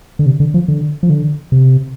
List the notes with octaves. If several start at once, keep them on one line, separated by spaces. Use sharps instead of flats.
D3
C3
D3
F3
D3
F3
D3
C3